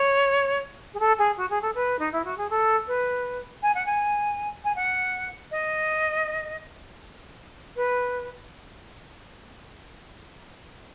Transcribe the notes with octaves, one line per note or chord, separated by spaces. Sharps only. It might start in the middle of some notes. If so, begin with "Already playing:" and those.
Already playing: C#5
G#4
A4
G#4
F#4
G#4
A4
B4
D#4
E4
F#4
G#4
A4
B4
G#5
F#5
G#5
G#5
F#5
D#5
B4